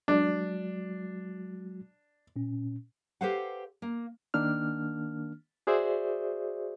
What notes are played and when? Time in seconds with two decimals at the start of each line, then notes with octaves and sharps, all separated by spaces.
0.08 F#3 G#3 D4 F#4
2.36 A#2 C#4
3.21 G4 A4 B4 C5 F5 F#5
3.82 A#3
4.34 D#3 A#3 D4 F6
5.67 F#4 G#4 C5 D5 E5